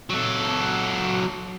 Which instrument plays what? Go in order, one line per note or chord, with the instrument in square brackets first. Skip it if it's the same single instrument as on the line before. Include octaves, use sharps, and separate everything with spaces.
[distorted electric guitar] F#3 A4